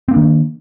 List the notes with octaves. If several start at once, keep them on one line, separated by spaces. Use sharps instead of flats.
D#3 A#3 C4 D4